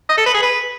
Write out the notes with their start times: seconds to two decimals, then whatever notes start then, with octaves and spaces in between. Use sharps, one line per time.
0.09 D#5
0.18 A4
0.26 B4
0.34 G#4
0.42 B4